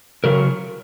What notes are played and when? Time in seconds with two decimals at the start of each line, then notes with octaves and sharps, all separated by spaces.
0.24 C#3 F#3 A#4